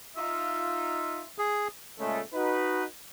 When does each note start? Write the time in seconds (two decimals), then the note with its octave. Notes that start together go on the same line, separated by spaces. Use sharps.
0.17 D#4 F4 E5
1.38 G#4
1.99 A#2 C#3 G#3 A3
2.34 D#4 F#4 B4